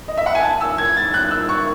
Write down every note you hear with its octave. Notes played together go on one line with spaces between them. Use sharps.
D#5
E5
F#5
G#5
A5
E6
G#6
A6
F#6
E6
C#6